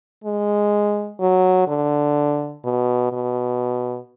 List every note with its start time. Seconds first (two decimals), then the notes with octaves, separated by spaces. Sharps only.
0.24 G#3
1.20 F#3
1.67 D3
2.64 B2
3.12 B2